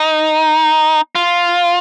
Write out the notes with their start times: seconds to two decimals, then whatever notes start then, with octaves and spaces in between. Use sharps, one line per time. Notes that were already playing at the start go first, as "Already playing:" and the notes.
Already playing: D#4
1.15 F4